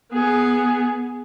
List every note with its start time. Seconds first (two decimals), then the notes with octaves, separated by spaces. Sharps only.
0.13 B3 G#4